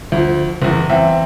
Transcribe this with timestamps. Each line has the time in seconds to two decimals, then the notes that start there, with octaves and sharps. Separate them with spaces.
0.12 D2 F3
0.62 F#1 E2
0.89 E2 C4 E5